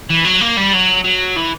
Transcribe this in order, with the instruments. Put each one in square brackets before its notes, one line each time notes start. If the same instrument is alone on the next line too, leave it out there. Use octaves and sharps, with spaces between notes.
[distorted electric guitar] E3
F#3
A#3
G3
F#3
F#3
E3